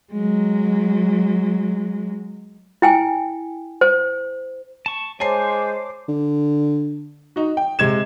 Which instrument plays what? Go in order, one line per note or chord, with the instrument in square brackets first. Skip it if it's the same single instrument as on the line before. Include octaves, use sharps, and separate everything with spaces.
[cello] F#3 G#3
[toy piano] E4 G5 G#5
C5
[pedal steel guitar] A5 C#6
[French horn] G#3 [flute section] C5 D6 [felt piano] C#5 A5 C7 [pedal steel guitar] G#5
[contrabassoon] D3
[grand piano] D#4 F#4
G5
C3 G#3 G#6 E7